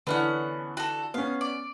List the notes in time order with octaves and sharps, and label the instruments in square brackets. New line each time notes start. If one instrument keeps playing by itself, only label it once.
[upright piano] D3 E3 [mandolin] B3 C#4 F#5
[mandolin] F#4 A4
[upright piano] B3 C#4 [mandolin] F5
[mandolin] D5